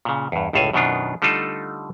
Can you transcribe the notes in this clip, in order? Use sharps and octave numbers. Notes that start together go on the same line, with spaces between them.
A#2 C#3
E2 G2
G1 C#2 A2 A4 F5 G#5
F#2 B2 D#3 B3 D4 F4
D3 G3 A3 D#4 F4 A4